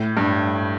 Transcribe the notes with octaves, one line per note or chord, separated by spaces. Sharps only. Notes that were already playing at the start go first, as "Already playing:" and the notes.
Already playing: A2
G2